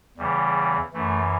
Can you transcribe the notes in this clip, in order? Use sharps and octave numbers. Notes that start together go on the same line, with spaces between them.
E2 C#3 E3 G3
F#2 E3 A3